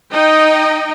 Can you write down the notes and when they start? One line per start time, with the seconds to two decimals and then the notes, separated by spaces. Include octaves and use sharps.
0.12 D#4 D#5 G5